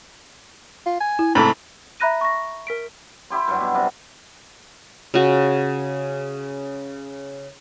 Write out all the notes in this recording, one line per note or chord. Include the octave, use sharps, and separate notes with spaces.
F4
G#5
E4
G#2 C3 A3 B5
E5 A#5 B5 F#6 A#6 D#7
C#6 A#6
A#4 B6 D7
E4 G4 C6
G2 F#3
B2
C3 D4 D#5
C#3 F#4